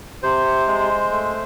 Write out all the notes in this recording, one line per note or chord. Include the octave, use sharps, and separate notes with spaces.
C3 C5
G#3
A3